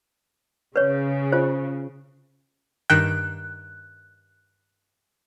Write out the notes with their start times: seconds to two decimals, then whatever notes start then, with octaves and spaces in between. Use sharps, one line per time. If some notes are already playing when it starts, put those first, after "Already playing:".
0.76 C#3 B4 C#5
1.32 F4 C5
2.90 G2 D#3 G5 F#6